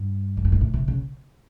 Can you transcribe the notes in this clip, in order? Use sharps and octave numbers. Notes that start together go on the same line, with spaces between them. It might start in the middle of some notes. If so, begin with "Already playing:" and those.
Already playing: G2
F#2
G2
G#2
A2
C3
C#3